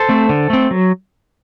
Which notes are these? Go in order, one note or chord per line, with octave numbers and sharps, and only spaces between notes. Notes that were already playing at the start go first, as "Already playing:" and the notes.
Already playing: A4 C5
A3 C4
D3
A3 C4
F#3